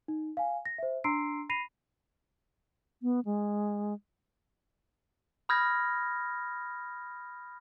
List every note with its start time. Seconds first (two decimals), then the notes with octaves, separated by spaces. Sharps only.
0.08 D#4
0.37 F5 G#5
0.66 A#6
0.78 C5 E5
1.04 D4 A#5 C6 E6 C7 D7
1.49 B5 A#6 C7 D#7 F7
3.02 B3
3.25 G#3
5.49 B5 D#6 F6 G6 G#6 A#6